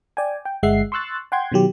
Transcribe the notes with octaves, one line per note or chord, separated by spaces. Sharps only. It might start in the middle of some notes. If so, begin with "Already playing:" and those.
D5 G5 G#5
G5
G1 G#3 E5 F#5 C7
C6 C#6 E6 F#6 A6
F#5 G5 C6 G6 G#6
B2 D#3 F#3 G4